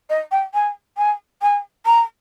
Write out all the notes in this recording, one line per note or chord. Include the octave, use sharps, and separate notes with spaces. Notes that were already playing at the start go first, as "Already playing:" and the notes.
D#5
G5
G#5
G#5
G#5
A#5